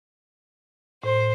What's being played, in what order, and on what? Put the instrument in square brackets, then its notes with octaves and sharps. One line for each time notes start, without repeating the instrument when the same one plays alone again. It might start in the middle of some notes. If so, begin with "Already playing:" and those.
[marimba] A2 [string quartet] C5